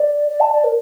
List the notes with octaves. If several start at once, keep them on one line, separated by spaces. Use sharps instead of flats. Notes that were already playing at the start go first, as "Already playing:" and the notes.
Already playing: D5
D5
A5
D5
A#4